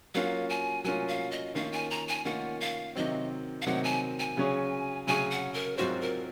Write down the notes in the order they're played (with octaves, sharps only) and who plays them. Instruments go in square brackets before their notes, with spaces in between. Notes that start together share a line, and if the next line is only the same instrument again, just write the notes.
[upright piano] F#3 A#3 C#4 F4 [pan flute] F5
[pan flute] G#5
[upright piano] F#3 A#3 C#4 F4 [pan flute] G#5
[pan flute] F5
D#5
[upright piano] D#3 A#3 C#4 F4 [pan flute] F5
[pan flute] G#5
A#5
G#5
[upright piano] D#3 A#3 C#4 F4 [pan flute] F#5
[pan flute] F5
[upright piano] C3 D#3 F#3 C4 [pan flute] D#5
[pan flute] F5
[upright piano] C3 D#3 F#3 C4 [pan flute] F#5
[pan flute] G#5
G#5
[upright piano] C#3 F#3 C#4 G#4 C#5
[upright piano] C#3 F#3 C#4 G#4 C#5 [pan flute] G#5
[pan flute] F#5
A#4
[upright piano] G#2 F#3 C4 F4 C5 [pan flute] F#4
[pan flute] A#4